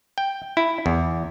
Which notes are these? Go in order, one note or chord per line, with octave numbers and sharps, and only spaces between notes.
G5
E4
E2